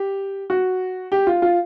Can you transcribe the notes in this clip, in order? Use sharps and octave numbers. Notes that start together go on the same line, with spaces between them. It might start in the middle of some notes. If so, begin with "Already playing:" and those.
Already playing: G4
F#4
G4
F4
F4